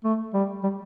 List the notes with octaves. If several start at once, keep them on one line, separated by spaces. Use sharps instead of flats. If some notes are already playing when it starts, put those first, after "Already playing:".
A3
G3
G3